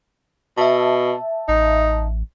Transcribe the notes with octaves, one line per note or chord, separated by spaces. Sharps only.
B2 E5 A5
A1 D#4